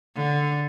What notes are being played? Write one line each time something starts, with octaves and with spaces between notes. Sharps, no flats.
D3